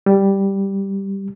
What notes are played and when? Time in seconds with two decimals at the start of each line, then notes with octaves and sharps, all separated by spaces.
0.06 G3